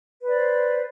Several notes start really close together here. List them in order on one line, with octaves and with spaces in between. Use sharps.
B4 D5 C5